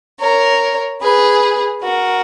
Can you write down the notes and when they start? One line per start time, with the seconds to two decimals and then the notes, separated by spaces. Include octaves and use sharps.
0.19 A#4 C#5
1.01 G#4 B4
1.84 F#4 A#4